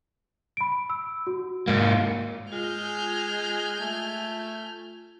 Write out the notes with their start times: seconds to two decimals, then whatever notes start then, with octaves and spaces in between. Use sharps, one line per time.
0.57 B5 D7
0.90 E6
1.27 F#4
1.68 G#2 A#3
2.52 G#3 F4 G#5 F6 G6
3.80 A3